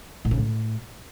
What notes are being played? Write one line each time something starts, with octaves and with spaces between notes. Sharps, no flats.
A2
C#3
A2